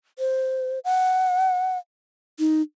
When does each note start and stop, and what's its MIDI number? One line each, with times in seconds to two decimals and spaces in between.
0.19 0.79 72
0.84 1.78 78
2.39 2.62 63